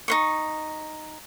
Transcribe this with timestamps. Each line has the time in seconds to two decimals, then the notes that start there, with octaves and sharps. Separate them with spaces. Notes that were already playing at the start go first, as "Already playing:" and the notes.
0.08 D#4 C5 C#6